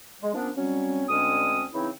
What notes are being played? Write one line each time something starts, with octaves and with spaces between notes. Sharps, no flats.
G#3
F3 A#3 B3 C#4 D4
F#3 G3 C4 C#4
D2 D3 G#3 C4 C#4 D#6
C#3 E3 C4 D#4 E4